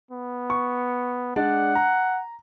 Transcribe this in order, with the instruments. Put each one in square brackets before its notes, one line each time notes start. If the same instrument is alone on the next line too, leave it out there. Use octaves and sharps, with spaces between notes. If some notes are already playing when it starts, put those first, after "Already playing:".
[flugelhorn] B3
[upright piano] C#6
[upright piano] G#3 D4 D5 [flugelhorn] F#5
[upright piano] A#5